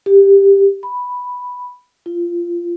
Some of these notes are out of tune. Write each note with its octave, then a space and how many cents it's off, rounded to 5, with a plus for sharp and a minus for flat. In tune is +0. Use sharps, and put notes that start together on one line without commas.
G4 +10
B5 +0
F4 -15